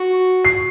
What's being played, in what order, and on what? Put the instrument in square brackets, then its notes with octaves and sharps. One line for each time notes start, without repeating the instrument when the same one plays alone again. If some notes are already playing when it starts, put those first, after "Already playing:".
Already playing: [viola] F#4
[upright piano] C7